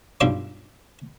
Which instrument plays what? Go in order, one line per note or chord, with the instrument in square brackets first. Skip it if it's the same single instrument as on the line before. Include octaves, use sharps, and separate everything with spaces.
[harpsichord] B1 G2 F3 E5 C6 D6